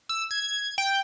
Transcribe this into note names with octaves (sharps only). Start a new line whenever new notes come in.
E6
G#6
G5